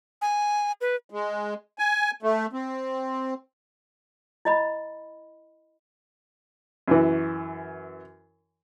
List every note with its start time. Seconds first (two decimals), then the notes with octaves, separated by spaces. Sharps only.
0.22 G#5
0.81 B4
1.10 G#3
1.79 G#5
2.23 A3
2.53 C4
4.45 E4 D#5 B5
6.88 F#2 E3